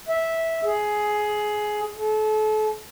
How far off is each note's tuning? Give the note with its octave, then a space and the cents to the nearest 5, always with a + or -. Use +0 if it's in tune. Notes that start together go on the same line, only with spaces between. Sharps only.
E5 -10
G#4 +15
A4 -35